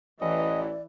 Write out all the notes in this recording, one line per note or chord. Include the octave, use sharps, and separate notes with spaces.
A1 E3 D5 D#5